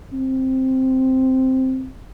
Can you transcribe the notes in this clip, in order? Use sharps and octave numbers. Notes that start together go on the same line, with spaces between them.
C4